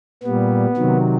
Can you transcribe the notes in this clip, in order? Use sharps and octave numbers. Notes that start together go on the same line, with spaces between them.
A#2 G3 B3
C3 D#3 F#3